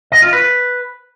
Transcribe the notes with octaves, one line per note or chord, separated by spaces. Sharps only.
D#5
F4
B4